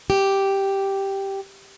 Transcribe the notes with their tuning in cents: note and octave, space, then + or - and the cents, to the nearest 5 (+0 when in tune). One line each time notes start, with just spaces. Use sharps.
G4 -5